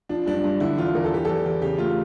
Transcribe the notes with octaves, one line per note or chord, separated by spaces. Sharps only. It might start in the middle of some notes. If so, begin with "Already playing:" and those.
F3 D4
G2 D4
G2 D4
D3 E4
E2 F4
E2 A#4
A4
E3 G4
E2 A4
E2
C#3 G4
A3 F4